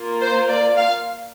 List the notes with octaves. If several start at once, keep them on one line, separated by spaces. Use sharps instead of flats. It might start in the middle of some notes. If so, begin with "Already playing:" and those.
Already playing: A#3 F4
C5
D5
F5